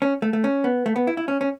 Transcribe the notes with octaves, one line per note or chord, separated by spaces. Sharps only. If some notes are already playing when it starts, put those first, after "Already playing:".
C#4
A3
A3
C#4
B3
A3
B3
E4
E4
C#4
C#4